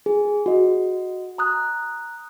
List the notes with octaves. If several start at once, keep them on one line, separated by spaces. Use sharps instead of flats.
G#4
F#4 D#5
A#5 D#6 F#6